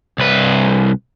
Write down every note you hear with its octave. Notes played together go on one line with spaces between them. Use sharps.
C2 B4